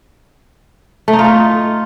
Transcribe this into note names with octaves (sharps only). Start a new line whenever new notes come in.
A3
D#4
F4
D#4